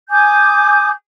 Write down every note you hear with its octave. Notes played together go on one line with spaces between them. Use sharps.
G#5 D6 D#6 G6